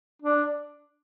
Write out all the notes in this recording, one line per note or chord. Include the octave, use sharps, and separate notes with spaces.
D4